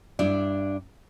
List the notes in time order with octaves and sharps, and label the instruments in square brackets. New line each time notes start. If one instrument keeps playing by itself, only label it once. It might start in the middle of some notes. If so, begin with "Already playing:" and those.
[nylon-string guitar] G2 D4 E4 D5